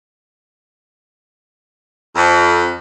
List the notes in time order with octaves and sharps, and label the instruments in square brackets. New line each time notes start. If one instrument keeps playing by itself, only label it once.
[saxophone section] F2